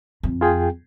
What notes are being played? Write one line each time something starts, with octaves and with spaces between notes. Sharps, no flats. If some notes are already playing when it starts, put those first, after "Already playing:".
F2
F4 G#4 G5